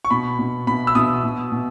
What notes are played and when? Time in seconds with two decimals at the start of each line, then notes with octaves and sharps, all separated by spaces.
0.05 C#6
0.10 B2 B5
0.39 B2
0.67 B2 B5
0.87 E6
0.95 B2 D#6
1.24 B2
1.52 B2